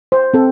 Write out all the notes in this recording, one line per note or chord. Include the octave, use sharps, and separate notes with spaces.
C5
C4 A4